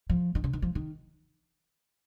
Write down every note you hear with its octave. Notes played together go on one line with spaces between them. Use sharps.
F3
D#3
C#3
D#3
F3
D#3